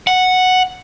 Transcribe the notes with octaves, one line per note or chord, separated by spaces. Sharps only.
F#5